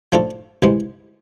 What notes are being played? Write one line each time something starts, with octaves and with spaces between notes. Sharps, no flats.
F3 A3 D4 F4 A4
C2 C3 E3 G#3